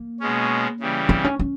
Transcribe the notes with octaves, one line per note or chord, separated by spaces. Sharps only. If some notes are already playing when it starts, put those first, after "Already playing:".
Already playing: A#3
B2 G#3 C#4
C#3 E3 G3
C4
C#4
C#4